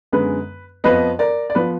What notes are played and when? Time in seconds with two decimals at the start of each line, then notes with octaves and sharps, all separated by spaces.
0.12 F#2 D3 G#3 B3 B4
0.84 F2 F3 B3 B4 D#5
1.19 A#4 D5
1.50 D5
1.55 F3 B3 B4